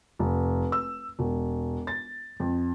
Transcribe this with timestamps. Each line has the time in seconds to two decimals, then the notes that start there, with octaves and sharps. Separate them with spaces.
0.19 F1
0.72 E6
1.19 E1
1.87 A6
2.40 F2